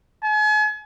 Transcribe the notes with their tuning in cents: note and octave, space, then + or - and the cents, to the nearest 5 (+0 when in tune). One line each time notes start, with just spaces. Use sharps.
G#5 +40